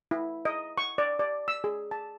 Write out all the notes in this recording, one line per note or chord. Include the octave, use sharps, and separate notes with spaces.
E4
D#5
C#6
D5
D5
E6
G#4
A5